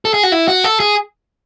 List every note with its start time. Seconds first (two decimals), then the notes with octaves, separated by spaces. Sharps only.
0.05 A4
0.14 G#4
0.23 F#4
0.32 E4
0.48 F#4
0.64 A4
0.80 G#4